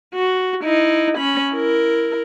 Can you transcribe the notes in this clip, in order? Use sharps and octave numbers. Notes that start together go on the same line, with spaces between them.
F#4
D#4 E4
C#4 B5
E4 A#4